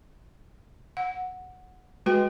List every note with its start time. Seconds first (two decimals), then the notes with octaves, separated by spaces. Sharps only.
0.97 F#5
2.06 G#3 F#4 B4 G5